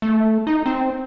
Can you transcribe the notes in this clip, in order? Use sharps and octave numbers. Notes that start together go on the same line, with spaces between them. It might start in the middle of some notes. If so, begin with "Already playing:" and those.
A3
D#4
C4